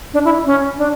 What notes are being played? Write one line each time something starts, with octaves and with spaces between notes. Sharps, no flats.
D4
E4
C#4
D4